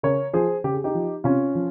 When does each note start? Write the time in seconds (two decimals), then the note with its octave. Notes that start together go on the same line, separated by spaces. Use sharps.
0.03 C#3 A#4 C#5
0.33 F3 G#4 C5
0.64 C#3 G4
0.74 G#4
0.84 D#4 G4
0.94 F3
1.24 C3 C#4 F4
1.55 F3